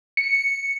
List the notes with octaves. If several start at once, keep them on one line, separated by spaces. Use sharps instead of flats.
C#7